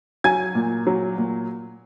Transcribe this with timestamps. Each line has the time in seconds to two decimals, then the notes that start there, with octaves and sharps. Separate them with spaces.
0.24 F#3 G#5 G#6
0.55 A#2
0.87 F#3
1.18 A#2